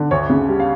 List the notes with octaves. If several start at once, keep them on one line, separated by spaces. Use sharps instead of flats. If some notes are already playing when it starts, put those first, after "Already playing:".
Already playing: D3
D2 C#5
C#3
G3
F5